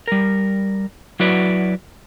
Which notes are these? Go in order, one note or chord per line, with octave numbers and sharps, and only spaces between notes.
G3 A#4
F#3 E4 F#4 B4 D5